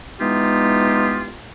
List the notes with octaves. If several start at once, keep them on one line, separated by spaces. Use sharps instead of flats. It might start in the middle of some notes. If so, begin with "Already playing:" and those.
E3 G#3 B3 D#4 F4 G4